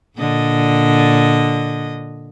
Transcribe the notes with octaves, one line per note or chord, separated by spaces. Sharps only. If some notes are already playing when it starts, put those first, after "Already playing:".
A#2 D3 D#5